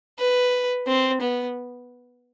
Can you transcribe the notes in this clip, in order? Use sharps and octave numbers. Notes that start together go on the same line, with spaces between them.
B4
C4
B3